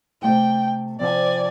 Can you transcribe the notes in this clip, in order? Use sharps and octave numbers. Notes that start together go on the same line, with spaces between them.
C3 A3 G5 G#5
C3 F3 C4 D5 G#5